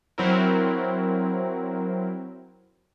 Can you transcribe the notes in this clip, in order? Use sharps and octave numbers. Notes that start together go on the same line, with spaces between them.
F#3 C4 E4 A#4